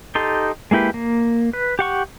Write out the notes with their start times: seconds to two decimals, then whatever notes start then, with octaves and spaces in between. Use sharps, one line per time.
0.15 D#4 G4 A4 C6
0.71 G#3 A#3 E4 G4 B4
0.94 A#3
1.53 B4
1.79 G4 F#5 C#6